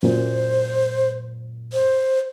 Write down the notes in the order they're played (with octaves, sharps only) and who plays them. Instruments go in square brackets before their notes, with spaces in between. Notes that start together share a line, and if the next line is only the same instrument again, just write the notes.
[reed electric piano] F#2 A#2 [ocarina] C5
[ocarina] C5